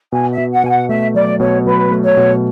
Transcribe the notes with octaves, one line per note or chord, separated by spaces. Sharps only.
B2 G#5
E5
B2
F#5
B2 G#5
F#5
A3 E5
F#3 D5
B2 C#5
F#3 B4
A3
C#5
B2